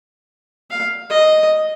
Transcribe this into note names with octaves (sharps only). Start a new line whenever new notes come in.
F5
D#5